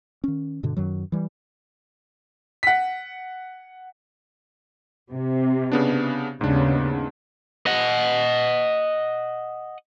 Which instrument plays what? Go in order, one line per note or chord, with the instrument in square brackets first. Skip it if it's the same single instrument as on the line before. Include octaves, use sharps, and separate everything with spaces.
[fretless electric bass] D#3 C#4
G2 B2 D3
F#2 D#3 F#3
E3 G3
[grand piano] F#5 B6
[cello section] C3
[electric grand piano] C#3 B3 D4
[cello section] D#2 C#3 B3 [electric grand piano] G#2 D4
[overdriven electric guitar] D#5 F#5